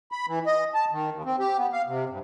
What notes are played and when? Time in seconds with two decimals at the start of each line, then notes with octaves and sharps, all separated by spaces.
0.12 B5
0.28 E3
0.46 D#5
0.74 A5
0.91 D#3
1.12 D#2
1.25 C4
1.40 G4
1.57 B3
1.73 F5
1.87 C3
2.09 G2